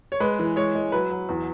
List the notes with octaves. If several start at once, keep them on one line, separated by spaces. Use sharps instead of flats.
C#5
G#3 B4
E3
G#3 C#5
G#3
F#3 B4
F#3
E2